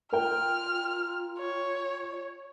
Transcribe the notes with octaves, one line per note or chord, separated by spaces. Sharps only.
F4 A#4 G5 F6
C#5